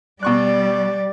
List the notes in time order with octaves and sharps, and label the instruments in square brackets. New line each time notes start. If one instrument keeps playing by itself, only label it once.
[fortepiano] B2 C#6 F#6 [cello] G3 [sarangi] D5